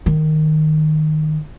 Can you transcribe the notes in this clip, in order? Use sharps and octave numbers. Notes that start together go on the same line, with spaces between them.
D#3